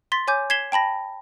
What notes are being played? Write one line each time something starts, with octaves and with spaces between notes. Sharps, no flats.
C6 A6 B6
C#5 G#5 D6 G6
G#6 B6 C7 E7 G7
G5 A5 B5 A#6